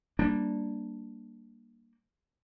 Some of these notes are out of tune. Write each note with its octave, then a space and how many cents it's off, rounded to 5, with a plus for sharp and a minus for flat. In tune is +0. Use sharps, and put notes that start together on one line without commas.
G3 +0 A#3 +0 D4 +0